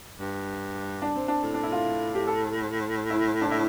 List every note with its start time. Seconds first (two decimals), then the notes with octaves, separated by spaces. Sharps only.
0.20 G2
1.02 D4
1.16 C4
1.28 D4
1.43 A2
1.54 D4
1.63 E4
1.72 F4
2.15 G4
2.27 A4
3.10 E4
3.42 D4
3.52 E4